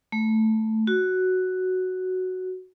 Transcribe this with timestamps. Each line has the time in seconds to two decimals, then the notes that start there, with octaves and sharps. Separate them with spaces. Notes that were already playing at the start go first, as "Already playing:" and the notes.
0.12 A3
0.87 F#4